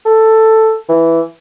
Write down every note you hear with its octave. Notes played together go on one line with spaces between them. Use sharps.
A4
E3